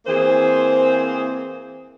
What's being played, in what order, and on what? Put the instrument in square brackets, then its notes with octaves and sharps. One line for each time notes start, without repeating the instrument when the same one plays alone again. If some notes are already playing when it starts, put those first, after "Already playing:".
[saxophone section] E3 A#3 C4 G#4 C5